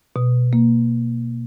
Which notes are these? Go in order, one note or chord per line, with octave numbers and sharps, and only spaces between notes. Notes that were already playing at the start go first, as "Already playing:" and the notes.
B2
A#3